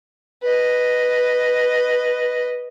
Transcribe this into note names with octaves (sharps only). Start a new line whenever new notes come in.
B4 D#5